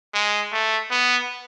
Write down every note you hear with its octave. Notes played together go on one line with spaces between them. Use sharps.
G#3
A3
B3